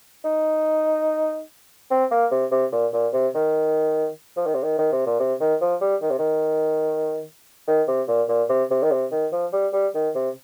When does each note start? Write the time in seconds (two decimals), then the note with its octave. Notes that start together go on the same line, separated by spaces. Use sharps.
0.25 D#4
1.90 C4
2.11 A#3
2.31 C3
2.51 C3
2.72 A#2
2.93 A#2
3.13 C3
3.35 D#3
4.37 F3
4.46 D#3
4.54 C3
4.63 D#3
4.78 D#3
4.92 C3
5.06 A#2
5.19 C3
5.40 D#3
5.61 F3
5.81 G3
6.02 D#3
6.10 C3
6.19 D#3
7.67 D#3
7.88 C3
8.08 A#2
8.28 A#2
8.49 C3
8.70 C3
8.82 D#3
8.91 C3
9.11 D#3
9.32 F3
9.53 G3
9.73 G3
9.94 D#3
10.15 C3